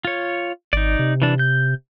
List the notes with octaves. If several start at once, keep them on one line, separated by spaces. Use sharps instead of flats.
F4 C#5
G#1 D#4 D5
C3
E3 D4
G6